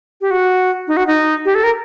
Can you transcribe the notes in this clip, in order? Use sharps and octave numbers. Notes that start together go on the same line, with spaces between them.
G4
F#4
D#4
F#4
D#4
G4
A4
A#4